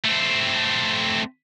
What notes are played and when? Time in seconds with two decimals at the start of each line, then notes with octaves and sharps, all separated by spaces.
0.04 A3 C4